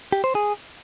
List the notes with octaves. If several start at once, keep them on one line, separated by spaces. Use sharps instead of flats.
G4
C5
G#4